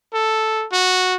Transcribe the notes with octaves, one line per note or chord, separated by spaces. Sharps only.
A4
F#4